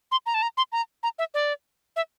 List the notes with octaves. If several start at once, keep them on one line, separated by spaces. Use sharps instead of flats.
C6
A#5
A5
A#5
C6
A#5
A#5
E5
D5
E5